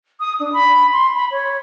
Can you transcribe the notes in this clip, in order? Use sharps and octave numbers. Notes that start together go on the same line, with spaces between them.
D#6
D4
B5
C6
B5
C#5